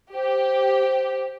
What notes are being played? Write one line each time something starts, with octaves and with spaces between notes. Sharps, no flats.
G4 C5